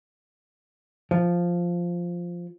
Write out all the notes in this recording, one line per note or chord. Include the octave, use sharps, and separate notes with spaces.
F3